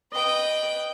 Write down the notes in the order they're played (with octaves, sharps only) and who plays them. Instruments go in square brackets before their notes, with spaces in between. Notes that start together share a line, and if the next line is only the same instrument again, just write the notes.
[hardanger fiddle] B4 G5 [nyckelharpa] D#5